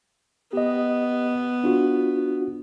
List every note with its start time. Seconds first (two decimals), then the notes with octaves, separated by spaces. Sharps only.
0.53 B3 G4 D#5
1.64 D4 F4 F#4